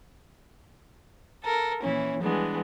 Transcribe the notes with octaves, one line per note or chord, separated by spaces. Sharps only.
A4 A#4
A#2 E3 C#4 E4
E3 G3 G#3 B3 D4